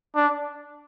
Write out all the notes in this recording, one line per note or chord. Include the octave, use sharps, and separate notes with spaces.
D4